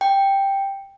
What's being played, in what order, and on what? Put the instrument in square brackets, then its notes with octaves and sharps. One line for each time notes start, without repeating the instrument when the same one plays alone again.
[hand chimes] G5